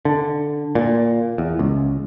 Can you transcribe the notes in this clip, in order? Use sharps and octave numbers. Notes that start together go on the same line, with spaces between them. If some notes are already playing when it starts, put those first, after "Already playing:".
D3
A#2
E2
C#2